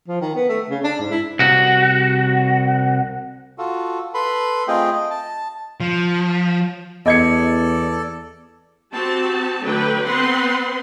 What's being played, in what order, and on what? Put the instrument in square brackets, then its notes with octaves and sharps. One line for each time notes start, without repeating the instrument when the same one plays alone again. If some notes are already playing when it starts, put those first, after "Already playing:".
[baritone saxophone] F3
D#3
B3
A3
C#3
D4
G#2
E4
[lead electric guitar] C2 F#4
[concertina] F4 F#4 A4
A4 B4 B5 C6
A3 C4 F4 G#4 D#5 G5
D#5
A5
[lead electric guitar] F3
[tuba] E2 [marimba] B3 [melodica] A4 D5 [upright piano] D#5 G#6 C#7
[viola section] C4 F#4 G4 A5
D3 F#3 A3 B4 G5
B3 C4 B4 F#5 C6